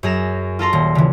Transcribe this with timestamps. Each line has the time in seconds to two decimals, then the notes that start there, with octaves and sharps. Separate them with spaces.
0.03 F#2 G#4 A#5 E7
0.59 F4 A4 A#5 C6
0.73 D#1
0.95 C#3 E3